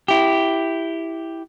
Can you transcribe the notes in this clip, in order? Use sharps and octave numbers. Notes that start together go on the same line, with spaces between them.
E4 G4